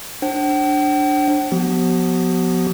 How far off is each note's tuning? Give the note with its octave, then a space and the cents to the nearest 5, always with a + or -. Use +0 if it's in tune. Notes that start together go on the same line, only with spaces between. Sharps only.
D4 +0 C5 +35 G5 -45
F3 +30 B3 +0 F#4 +45